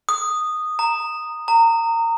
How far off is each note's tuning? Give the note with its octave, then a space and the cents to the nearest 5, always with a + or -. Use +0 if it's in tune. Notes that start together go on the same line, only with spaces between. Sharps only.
D#6 -10
A#5 -10
A#5 -25